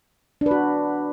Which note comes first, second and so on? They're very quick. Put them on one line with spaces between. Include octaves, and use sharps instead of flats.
D4 B4 F#4